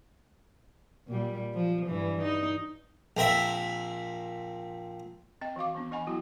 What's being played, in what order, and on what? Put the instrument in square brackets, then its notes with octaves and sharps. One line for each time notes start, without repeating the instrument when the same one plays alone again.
[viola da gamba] A#2 G3
F3
G2 E3
D#4
[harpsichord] A#1 C4 A#4 E5
[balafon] C4 D#5 G5
E3 F#4 F5 D6
E3 B3 D4
E3 D#5 F#5 G#5 B5
F#3 B3 E4 F#4 G5